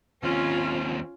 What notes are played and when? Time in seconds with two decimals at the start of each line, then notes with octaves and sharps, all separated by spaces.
0.23 D#2 C4 C#4 F4